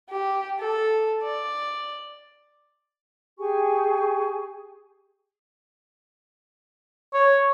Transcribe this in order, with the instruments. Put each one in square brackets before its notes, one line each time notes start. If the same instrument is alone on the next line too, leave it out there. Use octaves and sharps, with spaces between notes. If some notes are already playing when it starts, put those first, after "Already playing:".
[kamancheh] G4
A4
D5
[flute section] G4 G#4 G#5 C#6
[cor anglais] C#5